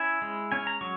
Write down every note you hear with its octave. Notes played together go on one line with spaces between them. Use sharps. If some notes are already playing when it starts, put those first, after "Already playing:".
Already playing: C#4 E4 G#5
G#3
C#4 G#5
A#5
F#3 C#6